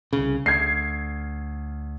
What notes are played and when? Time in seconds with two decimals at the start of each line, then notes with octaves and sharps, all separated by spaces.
0.13 C2 C#3
0.46 D2 G#6 C7